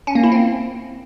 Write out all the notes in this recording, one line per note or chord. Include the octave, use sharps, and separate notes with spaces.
C#4
A#3
E4
C4